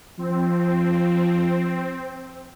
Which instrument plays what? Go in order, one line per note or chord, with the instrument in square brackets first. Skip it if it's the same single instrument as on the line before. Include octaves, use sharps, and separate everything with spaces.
[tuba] F3 [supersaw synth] C4